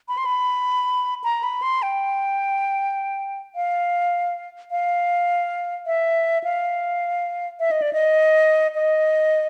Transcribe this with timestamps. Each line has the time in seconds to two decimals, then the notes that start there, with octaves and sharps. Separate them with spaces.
0.08 B5
0.18 C6
0.25 B5
1.24 A#5
1.43 B5
1.62 C6
1.82 G5
3.55 F5
4.71 F5
5.86 E5
6.44 F5
7.60 E5
7.71 D#5
7.82 D5
7.93 D#5
8.75 D#5